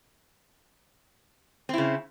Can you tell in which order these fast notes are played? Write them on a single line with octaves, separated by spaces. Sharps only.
C4 E4 C#3